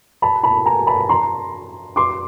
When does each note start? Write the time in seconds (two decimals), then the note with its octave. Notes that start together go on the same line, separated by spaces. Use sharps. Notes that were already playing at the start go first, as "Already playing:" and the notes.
0.22 A5 B5
0.43 A5 B5
0.66 G#5 A#5
0.87 A5 B5
1.09 A#5 C6
1.96 C6 D6